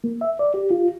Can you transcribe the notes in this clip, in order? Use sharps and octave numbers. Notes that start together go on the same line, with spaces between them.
A#3
E5
D5
G4
F4